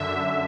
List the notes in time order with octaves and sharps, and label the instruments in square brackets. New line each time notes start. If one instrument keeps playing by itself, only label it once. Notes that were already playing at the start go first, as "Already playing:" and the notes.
Already playing: [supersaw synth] F#2 D3 E5